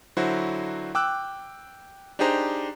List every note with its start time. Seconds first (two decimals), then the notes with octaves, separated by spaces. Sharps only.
0.17 D3 F#3 E4 F#4 C5
0.95 G5 D6 E6 F#6
2.19 D4 D#4 G4 G#4 C5 A#5